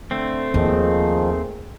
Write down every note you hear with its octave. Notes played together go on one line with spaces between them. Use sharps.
D3 A3 C4
D#2 D#3 F3 G#4